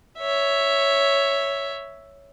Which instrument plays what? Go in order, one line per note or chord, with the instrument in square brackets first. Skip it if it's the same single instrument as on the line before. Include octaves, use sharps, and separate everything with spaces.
[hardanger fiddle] C#5 E5